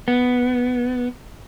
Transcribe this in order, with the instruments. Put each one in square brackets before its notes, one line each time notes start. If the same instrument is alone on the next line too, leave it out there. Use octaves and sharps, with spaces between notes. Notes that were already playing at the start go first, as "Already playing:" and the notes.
[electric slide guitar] B3